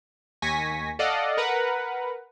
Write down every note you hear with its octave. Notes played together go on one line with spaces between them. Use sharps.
D#2 G#5 C#6 A#6 B6
A4 D5 D#5 F5 F#5
A#4 B4 F#5 A#5